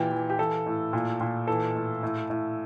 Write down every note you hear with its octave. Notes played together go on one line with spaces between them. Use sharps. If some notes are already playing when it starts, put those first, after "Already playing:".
Already playing: A#2 E3 G4
E3
G4
E3 A4
A2
A#2
A#2
E3 A4
A2
A2
A2